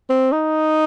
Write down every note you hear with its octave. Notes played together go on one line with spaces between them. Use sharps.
C4
D#4